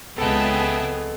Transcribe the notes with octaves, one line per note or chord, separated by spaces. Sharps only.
C#2 B3 G#4 A4 D#5 E5 G5 A5